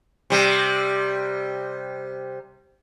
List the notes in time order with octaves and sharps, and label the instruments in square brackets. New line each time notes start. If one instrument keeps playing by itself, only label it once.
[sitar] C3 G3